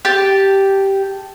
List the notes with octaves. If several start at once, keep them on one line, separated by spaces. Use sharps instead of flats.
G4 A5